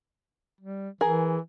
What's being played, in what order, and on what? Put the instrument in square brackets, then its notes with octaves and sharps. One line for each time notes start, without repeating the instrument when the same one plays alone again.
[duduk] G3
[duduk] E3 [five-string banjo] G#4 A#4